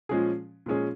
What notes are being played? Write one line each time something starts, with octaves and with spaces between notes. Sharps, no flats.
A#2 F3 G#3 C#4 G#4
A#2 F3 G#3 C#4 G#4